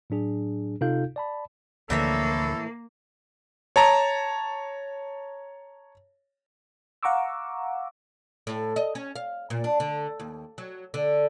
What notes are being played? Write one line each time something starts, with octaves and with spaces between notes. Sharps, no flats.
A2 F#3 D4 G#4
C3 D#4 F4 A4 F5 G6
D5 A5 B5
D2 A2 D3 E3 F3 A#3 A4 E5
C#5 A5 A#5
F5 F#5 A#5 C#6 D6 E6
A2
D#5
C#4
F5
A#2
D4
D3
D#2
F#3
D3